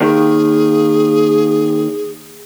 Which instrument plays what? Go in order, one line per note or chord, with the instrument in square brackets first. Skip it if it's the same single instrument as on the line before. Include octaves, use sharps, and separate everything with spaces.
[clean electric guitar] D#2 D#3 [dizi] G#4